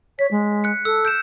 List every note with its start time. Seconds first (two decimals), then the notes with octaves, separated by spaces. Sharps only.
0.19 C#5 B6
0.31 G#3
0.64 F#6 C#7
0.85 A4 E6
1.05 G6 D7 E7